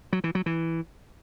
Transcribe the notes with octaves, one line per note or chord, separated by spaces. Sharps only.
F#3
E3
F#3
E3